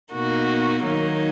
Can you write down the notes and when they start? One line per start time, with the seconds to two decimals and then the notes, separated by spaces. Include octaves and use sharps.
0.14 B2 A#3 D#4 F#4
0.84 D#3 F#3 A#3 D#4